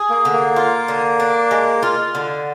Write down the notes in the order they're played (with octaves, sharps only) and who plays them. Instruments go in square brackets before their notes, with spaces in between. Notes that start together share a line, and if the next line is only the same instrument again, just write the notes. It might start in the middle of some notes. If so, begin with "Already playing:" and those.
Already playing: [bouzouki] G#4
[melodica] A#3
[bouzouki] D3
[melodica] A#3
[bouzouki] F4
D3
D4
G#3
F4
D3